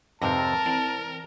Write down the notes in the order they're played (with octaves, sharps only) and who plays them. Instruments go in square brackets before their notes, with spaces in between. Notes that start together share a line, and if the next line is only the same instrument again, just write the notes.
[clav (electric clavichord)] F2 C3 C4 [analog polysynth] G#2 B4 A#6 [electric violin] A#4 [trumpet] A5
[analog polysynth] E3 C4 [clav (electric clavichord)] D5